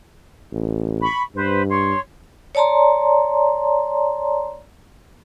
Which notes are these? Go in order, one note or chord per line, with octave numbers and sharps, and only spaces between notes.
A1
B5 C#6
G2 B4 C5
C#5 C6
C#5 D5 A5 A#5 C6